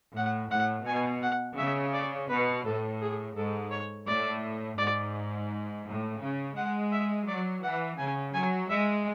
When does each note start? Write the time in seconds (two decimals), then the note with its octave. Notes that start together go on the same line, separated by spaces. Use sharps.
0.16 A2 F#5
0.51 A2 F#5
0.86 B2 G#5
1.22 F#5
1.58 C#3 E5
1.93 D5
2.29 B2 B4
2.64 A2 A4
3.01 G#4
3.36 G#2 A4
3.71 C#5
4.07 A2 D5
4.78 G#2 D5
5.85 A2
6.20 C#3
6.56 G#3 F#5
6.92 E5
7.27 F#3 D5
7.63 E3 F#5
7.98 C#3 G#5
8.34 F#3 G#5
8.70 G#3 E5